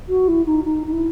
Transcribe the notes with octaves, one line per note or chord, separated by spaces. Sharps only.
F#4
E4
D#4
D#4
D#4
E4